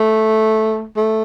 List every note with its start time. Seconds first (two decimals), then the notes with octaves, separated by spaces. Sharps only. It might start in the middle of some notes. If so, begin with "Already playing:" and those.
Already playing: A3
0.96 A3